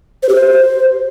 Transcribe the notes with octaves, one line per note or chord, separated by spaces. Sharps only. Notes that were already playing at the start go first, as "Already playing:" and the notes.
C5
G4
C5